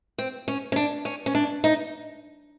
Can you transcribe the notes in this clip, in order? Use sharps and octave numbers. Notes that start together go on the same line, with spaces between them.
C4
C#4
C#4
D4
C#4
C#4
D4
D#4